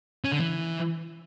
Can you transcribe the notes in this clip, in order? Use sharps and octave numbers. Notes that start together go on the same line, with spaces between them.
C#4
D3
E3